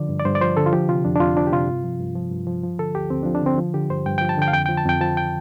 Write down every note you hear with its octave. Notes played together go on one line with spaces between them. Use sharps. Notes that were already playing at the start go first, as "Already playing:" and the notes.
Already playing: D3 F3 D5
G2
D5
G2 C5
D5
F3 C5
D3 A4
F4
F3 G4
C3 F4
F2 D4
D4
F2 F4
F3 D4
G4
C3 F4
G2
F3
G2
F3
G2
F3
F3
D3 A4
D2 G4
D2 C4
D4
F3
D4
D3 C4
F3
D3 G4
G2 C5
G2 G5
G5
F3
A5
D3 G5
F5
F2 G5
F3 G5
A5
F2 G5
F3 A5
G5